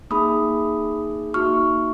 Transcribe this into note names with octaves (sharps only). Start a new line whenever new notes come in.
A#3 D#4 G#4 B5 D#6
A#3 D#4 F#4 C#6 F6